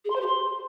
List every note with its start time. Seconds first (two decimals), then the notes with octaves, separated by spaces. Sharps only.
0.05 G#4
0.10 C6
0.16 C5
0.21 G4
0.26 C6